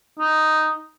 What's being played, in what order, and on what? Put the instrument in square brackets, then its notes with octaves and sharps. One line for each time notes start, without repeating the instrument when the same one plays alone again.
[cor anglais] D#4